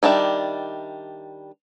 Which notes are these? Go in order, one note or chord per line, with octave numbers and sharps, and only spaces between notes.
D#3 G3 D4 E5